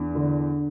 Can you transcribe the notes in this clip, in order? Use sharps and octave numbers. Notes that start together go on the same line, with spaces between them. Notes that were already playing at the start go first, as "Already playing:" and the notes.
Already playing: E2 D4
D3